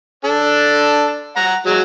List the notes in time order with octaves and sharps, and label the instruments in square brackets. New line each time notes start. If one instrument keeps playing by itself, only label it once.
[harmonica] D4 A4
F#5 A#5
F#3 G#3 F#4